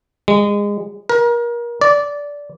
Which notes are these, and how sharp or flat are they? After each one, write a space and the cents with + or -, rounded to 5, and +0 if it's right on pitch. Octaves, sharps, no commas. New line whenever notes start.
G#3 -25
A#4 +30
D5 -15